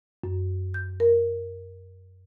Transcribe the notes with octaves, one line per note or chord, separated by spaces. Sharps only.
F#2
G6
A#4